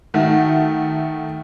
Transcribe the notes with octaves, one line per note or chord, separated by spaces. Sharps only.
D#3 A3 F#4